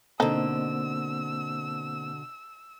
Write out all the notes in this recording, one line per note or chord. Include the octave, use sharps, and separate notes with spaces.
B2 D3 A#3 C4 D#4 A4 C5 E6